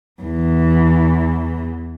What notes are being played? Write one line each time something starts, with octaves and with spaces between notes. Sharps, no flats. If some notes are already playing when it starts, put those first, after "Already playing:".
E2 E3